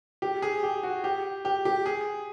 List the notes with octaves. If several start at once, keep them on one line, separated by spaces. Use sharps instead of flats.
G4
G#4
G4
F#4
G4
G4
G4
G#4